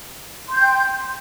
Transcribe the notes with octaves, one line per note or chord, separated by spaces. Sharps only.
G5 C6 G6